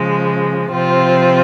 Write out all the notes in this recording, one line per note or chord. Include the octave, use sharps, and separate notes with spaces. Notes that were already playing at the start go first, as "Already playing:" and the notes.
Already playing: C#3 F3 G#3
C3 F3 C4 F4